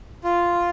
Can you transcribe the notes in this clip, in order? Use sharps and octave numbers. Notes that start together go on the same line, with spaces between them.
F4